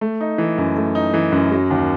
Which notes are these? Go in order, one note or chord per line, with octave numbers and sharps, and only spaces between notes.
A3
D#4
E3
F#2
A3
D#4
E3
F#2
F#3
D#2